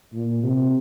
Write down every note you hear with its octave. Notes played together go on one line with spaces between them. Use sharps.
A#2
C3